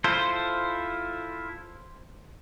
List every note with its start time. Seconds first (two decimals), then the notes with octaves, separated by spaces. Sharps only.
0.04 E4 F4 A4 C5